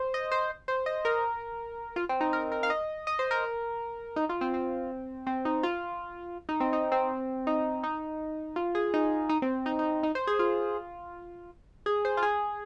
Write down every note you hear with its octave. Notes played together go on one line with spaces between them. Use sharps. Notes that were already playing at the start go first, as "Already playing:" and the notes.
Already playing: C5
D#5
C5
C5
D#5
A#4
F4
C4
D#4
A#4
A#4
F5
D#5
D#5
C5
A#4
D#4
F4
C4
C4
C4
D#4
F4
D#4
C4
D#4
C4
D#4
D#4
F4
G#4
D#4
D#4
C4
D#4
D#4
D#4
C5
G#4
F4
G#4
C5
F4
G#4